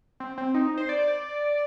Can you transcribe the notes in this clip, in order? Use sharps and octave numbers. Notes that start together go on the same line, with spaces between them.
C4
C4
D#4
C5
D5